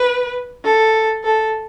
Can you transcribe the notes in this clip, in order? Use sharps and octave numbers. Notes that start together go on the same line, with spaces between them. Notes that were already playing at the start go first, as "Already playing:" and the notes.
Already playing: B4
A4
A4